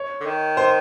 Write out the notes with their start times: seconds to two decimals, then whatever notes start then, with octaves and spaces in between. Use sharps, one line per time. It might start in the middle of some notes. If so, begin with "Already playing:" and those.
Already playing: C#5
0.20 D3
0.26 D#3
0.57 C5